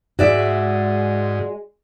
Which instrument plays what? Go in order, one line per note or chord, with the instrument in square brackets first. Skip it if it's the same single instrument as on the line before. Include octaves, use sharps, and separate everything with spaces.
[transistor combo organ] G#2 [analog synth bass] G#3 [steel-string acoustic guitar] F#4 D5 E5